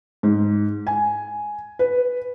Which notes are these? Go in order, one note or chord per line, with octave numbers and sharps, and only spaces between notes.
G#2
G#5
B4